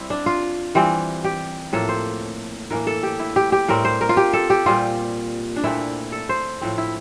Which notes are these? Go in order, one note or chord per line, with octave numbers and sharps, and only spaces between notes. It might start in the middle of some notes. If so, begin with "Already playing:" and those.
Already playing: G3 C4 E4
D4
F4
E3 G3 C4
G4
A2 F3 A#3 A4
C5
A2 E3 A#3 A#4
A4
G4
E4
G4
G4
A2 G3 C4 A#4
C5
A#4
F4
G4
A4
G4
A#2 G3 C4 F4
D4
A#2 A3 C4 E4
A4
C5
A2 F3 C4
E4